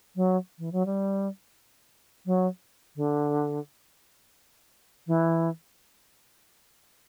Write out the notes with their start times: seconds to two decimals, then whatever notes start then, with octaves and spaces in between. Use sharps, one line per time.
0.16 F#3
0.59 E3
0.72 F#3
0.86 G3
2.26 F#3
2.96 D3
5.07 E3